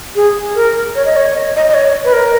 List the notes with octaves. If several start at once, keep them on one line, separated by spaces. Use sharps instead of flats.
G#4
A#4
C#5
D#5
C#5
D#5
D#5
D#5
C#5
B4
A#4